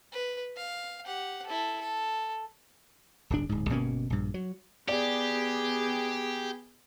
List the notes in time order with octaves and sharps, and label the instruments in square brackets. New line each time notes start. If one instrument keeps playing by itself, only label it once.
[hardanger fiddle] B4
F5
G4 F#5
E4 A4
A4
[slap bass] D1 G1 D4
D1 G#2
G1 B2 A#3 C#4
A#1 G2
F#3
[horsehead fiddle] B3 G#4 [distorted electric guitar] G4 [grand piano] D5